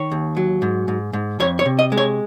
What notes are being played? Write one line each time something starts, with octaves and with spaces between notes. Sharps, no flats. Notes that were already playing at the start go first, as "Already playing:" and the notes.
Already playing: D#3 C#5
D#2
F#3
G#2
G#2
G#2
F2 C#5
C#5
C3
D#5
G#3
C#5